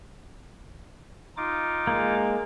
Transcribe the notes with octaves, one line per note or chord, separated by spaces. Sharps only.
D#4 F4 D6
G#3 A#3